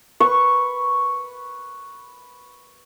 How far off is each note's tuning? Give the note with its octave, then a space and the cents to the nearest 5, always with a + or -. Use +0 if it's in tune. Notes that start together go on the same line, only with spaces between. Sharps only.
B4 +0 C#6 +0